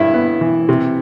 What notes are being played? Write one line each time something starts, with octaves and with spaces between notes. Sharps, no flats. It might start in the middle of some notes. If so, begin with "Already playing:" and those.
Already playing: G2 E4 E5
B3
E3
C3